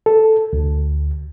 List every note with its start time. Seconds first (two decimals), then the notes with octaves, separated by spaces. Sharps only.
0.06 A4
0.53 D2